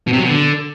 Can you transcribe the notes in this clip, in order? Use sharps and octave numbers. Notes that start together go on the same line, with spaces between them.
B2
C3
F#3
B2
D3